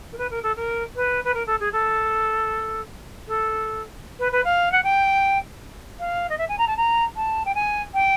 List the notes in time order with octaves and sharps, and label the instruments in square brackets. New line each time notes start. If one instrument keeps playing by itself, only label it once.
[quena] A#4
B4
A#4
A4
A#4
B4
B4
A#4
A4
G#4
A4
A4
B4
B4
F5
F#5
G5
F5
D#5
E5
G#5
A#5
A5
A#5
A5
G5
G#5
G5